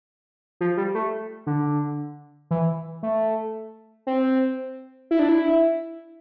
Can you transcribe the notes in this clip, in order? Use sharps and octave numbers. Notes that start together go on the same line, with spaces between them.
F3
G3
A3
D3
E3
A3
C4
E4
D4
E4